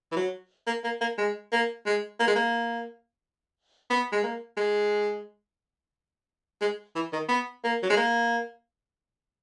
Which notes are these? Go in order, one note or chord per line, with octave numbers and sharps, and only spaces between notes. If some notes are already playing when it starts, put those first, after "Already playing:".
E3
F#3
A#3
A#3
A#3
G#3
A#3
G#3
A#3
G#3
A#3
B3
G#3
A#3
G#3
G#3
E3
D#3
B3
A#3
F#3
G#3
A#3